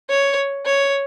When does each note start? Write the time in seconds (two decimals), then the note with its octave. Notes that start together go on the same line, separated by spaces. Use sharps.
0.10 C#5
0.66 C#5